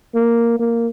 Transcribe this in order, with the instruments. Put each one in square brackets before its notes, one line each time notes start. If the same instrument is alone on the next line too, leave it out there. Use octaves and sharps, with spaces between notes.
[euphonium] A#3
A#3